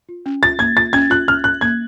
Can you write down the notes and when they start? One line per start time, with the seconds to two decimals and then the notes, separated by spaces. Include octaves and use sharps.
0.09 F4
0.26 C#4
0.43 F4 A6
0.59 A#3 G#6
0.77 F4 A6
0.93 C#4 G#6
1.10 F4 F#6
1.28 C#4 F6
1.44 C#4 F#6
1.61 A#3 G#6